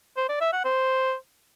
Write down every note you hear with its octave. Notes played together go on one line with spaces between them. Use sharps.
C5
D5
E5
F#5
C5